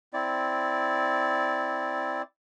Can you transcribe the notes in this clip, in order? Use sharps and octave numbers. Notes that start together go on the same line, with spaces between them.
C4 E4 D5